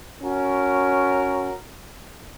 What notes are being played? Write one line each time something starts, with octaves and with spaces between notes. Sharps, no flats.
C#4 F#4 A#4